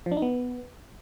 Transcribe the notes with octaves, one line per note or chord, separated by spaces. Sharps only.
F3
D4
D#4
B3